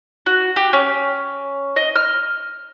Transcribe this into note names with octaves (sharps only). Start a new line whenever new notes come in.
F#4
G4
C#4
D#5
F6